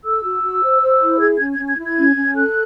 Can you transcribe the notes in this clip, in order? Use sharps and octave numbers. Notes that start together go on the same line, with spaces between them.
A4 E6
F#4
F#4
C5
C5
E4
G#4 G#6
C#4 G#6
G#6
C#4
G#6
E4
G#6
C#4
C#4
A4 F#6